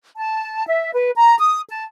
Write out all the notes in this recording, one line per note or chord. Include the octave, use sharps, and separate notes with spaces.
A5
E5
B4
A#5
D#6
A5